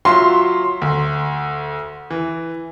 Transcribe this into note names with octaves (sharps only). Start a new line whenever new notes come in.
F#3 F4 E5 C6
D2
E3